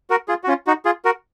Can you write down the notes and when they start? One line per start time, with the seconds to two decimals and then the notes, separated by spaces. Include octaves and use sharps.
0.10 F#4 A#4
0.28 F4 G#4
0.44 F#4
0.48 C#4 F4
0.67 D#4 F#4
0.85 F4 G#4
1.05 F#4 A#4